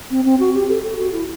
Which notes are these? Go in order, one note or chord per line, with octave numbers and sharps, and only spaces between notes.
C4
C4
F#4
G4
A4
A4
F#4
E4